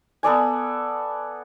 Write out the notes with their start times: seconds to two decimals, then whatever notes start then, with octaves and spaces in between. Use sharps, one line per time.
0.23 B3 A4 D5 G#5